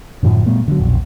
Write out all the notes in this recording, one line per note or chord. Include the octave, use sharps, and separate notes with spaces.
F#2 A2 D3 F3
A#2 G3 A3 B3
D3 F#3
E1 A#1